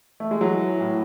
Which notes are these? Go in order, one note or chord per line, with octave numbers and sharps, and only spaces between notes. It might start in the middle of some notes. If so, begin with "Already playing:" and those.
A3
G#3
E3 F#3
A2